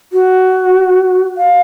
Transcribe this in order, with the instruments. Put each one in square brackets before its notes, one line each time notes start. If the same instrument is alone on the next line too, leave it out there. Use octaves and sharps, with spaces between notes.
[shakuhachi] F#4
F5